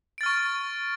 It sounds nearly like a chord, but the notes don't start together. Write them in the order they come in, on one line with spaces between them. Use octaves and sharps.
D7 A6 F6 C#6